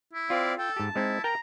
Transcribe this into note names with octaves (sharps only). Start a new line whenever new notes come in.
E4
C4 F4 D5 F5
A4 G5
G#2 G4 A5
G#3 C4 D#4 E4
A#4 G5 A#5